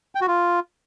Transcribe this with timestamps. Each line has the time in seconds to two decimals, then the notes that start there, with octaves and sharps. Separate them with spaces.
0.15 G5
0.21 F#4
0.27 F4